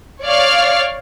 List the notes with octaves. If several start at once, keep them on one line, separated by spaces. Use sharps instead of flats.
C#5 D5 F5 F6